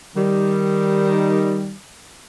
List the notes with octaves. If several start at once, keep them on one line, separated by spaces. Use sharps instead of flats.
D#3 G3